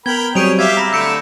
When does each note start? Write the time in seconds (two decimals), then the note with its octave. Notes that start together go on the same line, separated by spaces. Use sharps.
0.06 B3 A#4 G5 B5 G#6 G7
0.35 F#3 G3 C4 G#4 C#5 G6 D7 F7
0.59 G4 E5 F5 G#6
0.77 A#5 B5 A#6 E7
0.93 D3 A3 E6 G6 C#7 D7